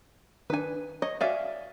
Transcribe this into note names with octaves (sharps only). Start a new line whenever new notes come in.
D#3 D4 B4 G#5
C#5 D#5
F#4 C#5 D5 E5 F5 G#5